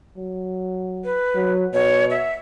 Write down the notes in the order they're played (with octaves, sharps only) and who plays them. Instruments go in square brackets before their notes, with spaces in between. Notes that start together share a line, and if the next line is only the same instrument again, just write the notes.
[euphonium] F#3
[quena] B4
[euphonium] F#3
[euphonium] B2 [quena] C#5
[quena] E5